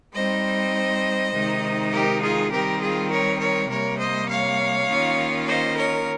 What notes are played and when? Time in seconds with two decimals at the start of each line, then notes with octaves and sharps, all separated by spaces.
0.14 G3 C4 D#4 C5 D#5
1.33 C3 D#3 G#3 D#4
1.92 G4 A#4
2.22 F4 G#4
2.51 D#3 G3 C4 G4 A#4
2.81 F4 G#4
3.10 A#4 C#5
3.40 A#4 C#5
3.69 C3 G3 A#3 A#4 C#5
3.99 C5 D#5
4.29 C#5 F5
4.88 D#3 A#3 C#4 F4
5.47 C5 D#5
5.77 A#4 C#5